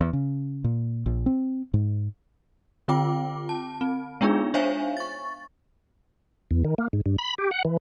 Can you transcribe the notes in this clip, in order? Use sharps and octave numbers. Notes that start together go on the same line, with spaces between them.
E2
C#3
A#2
A#1
C4
G#2
D3 C4 F4 G5 D6
A5
C4
G#3 B3 D4 D#4 F4 G#4
D4 C5 C#5 E5 F5 G#5
C#6 A6
E2
D#3
A#3
G#2
G2
B5
G4
F#5
E3